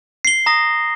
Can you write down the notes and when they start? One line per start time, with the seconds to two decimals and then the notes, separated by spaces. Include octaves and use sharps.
0.25 C7 G7
0.46 A#5 D#6 A#6